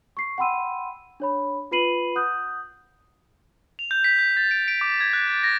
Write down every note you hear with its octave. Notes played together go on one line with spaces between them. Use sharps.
C#6 C7
F#5 G5 B5 C6 E6 D#7
D4 C#5 B5
F4 B4 B5 C7 D#7 F#7
F#5 D#6 F#6 G6
F7
G6
B6
G6
A6
D7
D7
D6
G#6
F#6
A6
A#6